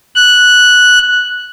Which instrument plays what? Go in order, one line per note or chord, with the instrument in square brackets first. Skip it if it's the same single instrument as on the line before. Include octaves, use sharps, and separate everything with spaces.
[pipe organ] F#6